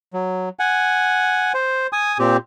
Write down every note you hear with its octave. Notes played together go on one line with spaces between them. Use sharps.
F#3
F#5 G#5
C5
G#5 D#6
A#2 C4 G4